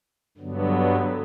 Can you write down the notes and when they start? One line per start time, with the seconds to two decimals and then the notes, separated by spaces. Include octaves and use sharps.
0.37 G2 D3 F#3 B3